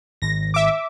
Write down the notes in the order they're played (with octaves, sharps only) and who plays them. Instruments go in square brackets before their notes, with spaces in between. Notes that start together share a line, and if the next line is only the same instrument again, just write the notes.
[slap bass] G#1 [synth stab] A#6
[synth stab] E5 D6